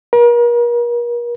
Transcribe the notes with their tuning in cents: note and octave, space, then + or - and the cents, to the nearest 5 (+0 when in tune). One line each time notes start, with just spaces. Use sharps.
A#4 +40